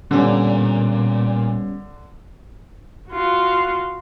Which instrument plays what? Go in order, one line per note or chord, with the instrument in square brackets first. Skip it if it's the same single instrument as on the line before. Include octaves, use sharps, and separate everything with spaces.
[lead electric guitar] A#2 [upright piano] D3 [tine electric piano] G3 B3 C#4
[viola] F4 F#4